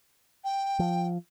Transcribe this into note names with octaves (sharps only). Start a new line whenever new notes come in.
G5
F3